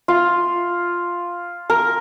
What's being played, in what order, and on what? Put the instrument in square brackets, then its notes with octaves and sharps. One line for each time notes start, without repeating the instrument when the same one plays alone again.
[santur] F4
A#4